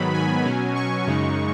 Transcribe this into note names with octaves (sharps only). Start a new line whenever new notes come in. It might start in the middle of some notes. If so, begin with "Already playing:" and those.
Already playing: G#2 D#3 F#3 B3 B5
G#5
B2 F#3 C#4
C#6
F#2 C#3 G#3 D#4